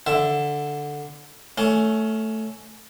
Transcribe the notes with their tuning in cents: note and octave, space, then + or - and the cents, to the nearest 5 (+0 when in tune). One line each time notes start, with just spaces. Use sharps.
D3 +0 E5 +5
A3 +0 C#4 +20